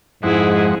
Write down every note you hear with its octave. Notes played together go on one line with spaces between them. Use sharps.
F2 G#2 G#3 E4 G#4 F#5